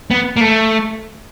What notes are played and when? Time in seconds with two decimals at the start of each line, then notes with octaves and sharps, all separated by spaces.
0.11 B3
0.36 A#3
0.41 A3